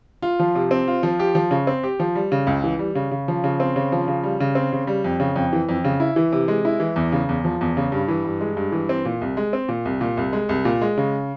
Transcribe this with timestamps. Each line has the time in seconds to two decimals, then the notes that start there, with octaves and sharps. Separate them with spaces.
0.22 F4
0.40 F3
0.55 C3
0.71 C4
0.88 F4
1.03 F3
1.19 G4
1.35 F3
1.51 C#3
1.67 C4
1.83 G4
2.00 F3
2.15 G3
2.32 C#3
2.47 C#2
2.64 E3
2.79 G3
2.95 C#3
3.11 C#3
3.28 F3
3.44 C#3
3.60 C4
3.76 C#3
3.92 F3
4.08 C#3
4.23 G3
4.40 C#3
4.55 C4
4.72 C#3
4.87 G3
5.04 F2
5.20 C#3
5.36 F2
5.53 E3
5.69 F2
5.84 C#3
6.00 E4
6.16 E3
6.32 C3
6.48 G#3
6.65 E4
6.80 E3
6.96 E2
7.12 C#3
7.29 E2
7.44 F3
7.61 E2
7.77 C#3
7.92 G2
8.08 E3
8.24 G2
8.41 G#3
8.57 G2
8.72 E3
8.89 C4
9.05 A#2
9.21 C2
9.37 G#3
9.53 C4
9.68 A#2
9.85 C2
10.01 A#2
10.17 C2
10.33 G#3
10.49 C2
10.65 A#2
10.82 G#3
10.97 C#3